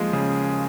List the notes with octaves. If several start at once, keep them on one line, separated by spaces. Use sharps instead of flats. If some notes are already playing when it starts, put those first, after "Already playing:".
Already playing: D#2 F3 G#3 G#4
C#3